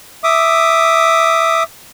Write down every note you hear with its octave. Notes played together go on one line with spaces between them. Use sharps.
E5 D6 D#6